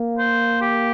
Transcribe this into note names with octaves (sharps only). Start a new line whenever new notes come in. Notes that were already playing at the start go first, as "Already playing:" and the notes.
Already playing: A#3
C5
G4